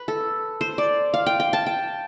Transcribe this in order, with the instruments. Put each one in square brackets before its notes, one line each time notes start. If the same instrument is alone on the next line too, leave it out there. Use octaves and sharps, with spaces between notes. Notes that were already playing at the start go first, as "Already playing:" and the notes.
Already playing: [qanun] B4
A4
C5
D5
F5
G5
G5
A5
G5